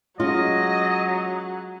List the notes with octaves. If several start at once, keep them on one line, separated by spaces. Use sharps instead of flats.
F#3 G#3 C#4 F4 D#5